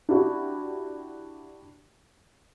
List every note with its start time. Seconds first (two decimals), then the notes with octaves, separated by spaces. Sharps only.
0.09 D4 E4 F#4 G4